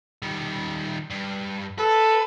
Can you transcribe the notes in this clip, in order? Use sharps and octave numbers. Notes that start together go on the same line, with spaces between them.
D#3 G3
G2
A4 B4